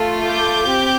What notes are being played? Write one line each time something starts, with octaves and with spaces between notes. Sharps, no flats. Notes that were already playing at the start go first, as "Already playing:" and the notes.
Already playing: A3 F4 A4
D6 G6
C4 G4